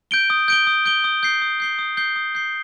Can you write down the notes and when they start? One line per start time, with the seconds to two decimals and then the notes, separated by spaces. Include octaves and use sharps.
0.11 G6 D7 G7
0.30 D#6
0.48 G6 D7 G7
0.67 D#6
0.86 G6 D7 G7
1.04 D#6
1.23 G6 C7 G7
1.42 D#6
1.60 G6 C7 G7
1.79 D#6
1.97 G6 C7 G7
2.16 D#6
2.35 G6 C7 G7